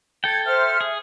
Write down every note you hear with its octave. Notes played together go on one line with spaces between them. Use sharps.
A4 G5 G#6
C5 E5 F6
G#4